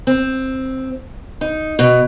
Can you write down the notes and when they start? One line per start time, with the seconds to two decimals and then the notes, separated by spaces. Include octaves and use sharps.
0.07 C4
1.41 D#4
1.79 B2